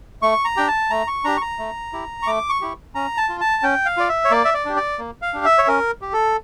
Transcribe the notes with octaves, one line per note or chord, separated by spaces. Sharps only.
A3 C#6
A#5
D4 G4 G5
A5
A3 A#5
C#6
D4 G4 A#5
C#6
A#5
A3
E4 G4
C#6
A3 D6
C#6
E4 G4
C#4 A#5
A5
F4
A5
C#4 G5
F5
F4 D5
E5
C#5
A#3 D5
E5
D5
D4 G4
D5
A#3
F5
D4 G4
E5
C#5
C#4 A#4
G4
A4